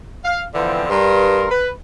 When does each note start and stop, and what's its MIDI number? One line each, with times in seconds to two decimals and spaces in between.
0.25 0.43 77
0.55 0.86 50
0.55 0.86 52
0.55 0.86 53
0.55 0.86 59
0.55 0.86 60
0.90 1.47 43
0.90 1.47 70
0.90 1.47 84
1.51 1.70 71